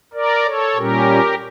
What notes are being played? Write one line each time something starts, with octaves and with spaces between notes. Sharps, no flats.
A#4 D5
A4 C#5
A#2 G3 C#4 G4 A#4